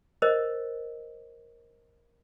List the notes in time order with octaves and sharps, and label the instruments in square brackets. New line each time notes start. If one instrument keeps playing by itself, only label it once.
[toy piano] A#4 C5 D#5